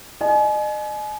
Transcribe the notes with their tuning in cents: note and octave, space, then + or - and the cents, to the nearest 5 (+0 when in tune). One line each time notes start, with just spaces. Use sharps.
D#5 -40 G#5 +35